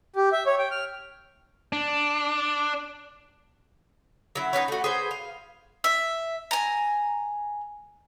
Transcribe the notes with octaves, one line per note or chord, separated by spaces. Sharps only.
G4
E5
C#5
G5
F6
D4
F#3 E4
D#4 F4 B4 C#5
A3 F#4
G#4 B4 C5
F5
E5
G#5 A#5